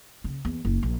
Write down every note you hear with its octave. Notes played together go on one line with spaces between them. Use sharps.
C#3
E2
F#1
A#1